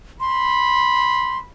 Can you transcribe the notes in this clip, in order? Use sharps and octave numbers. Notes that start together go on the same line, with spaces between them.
B5 C6